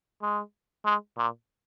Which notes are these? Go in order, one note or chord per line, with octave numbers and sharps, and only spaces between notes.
G#3
G#3
A#2